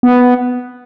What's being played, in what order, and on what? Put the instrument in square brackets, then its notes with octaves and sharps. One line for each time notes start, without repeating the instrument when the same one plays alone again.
[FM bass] B3